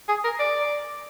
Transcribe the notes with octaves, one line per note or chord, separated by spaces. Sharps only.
G#4
A#4
D5